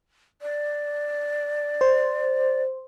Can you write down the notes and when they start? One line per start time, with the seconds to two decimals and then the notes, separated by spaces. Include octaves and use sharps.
0.42 D5
1.81 C5